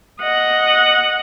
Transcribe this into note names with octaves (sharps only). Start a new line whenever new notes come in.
D#5 F#5